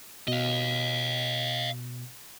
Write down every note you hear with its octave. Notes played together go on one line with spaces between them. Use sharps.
B2 D#5 F5